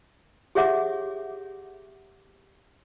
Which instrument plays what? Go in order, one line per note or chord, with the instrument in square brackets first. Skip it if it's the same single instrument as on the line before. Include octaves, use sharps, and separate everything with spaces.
[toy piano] G4 G#4 C#5 E5 F#5 D6